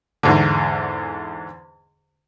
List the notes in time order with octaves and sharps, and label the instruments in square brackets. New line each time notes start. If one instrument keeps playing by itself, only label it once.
[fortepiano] E2 G#2 D3